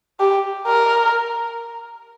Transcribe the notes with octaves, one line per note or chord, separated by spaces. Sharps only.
G4
A#4